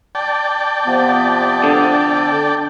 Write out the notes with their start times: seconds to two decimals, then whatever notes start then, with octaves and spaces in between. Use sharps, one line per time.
0.15 D5 G5 A5
0.86 C3 F3 B3
1.64 D3